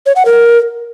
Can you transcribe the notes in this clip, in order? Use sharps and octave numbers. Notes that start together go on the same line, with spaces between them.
C#5
F#5
A#4